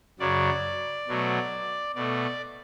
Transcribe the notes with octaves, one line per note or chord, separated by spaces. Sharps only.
F#2 C#3 F#3 D5
B2 F#3 A3
B2 A3 D5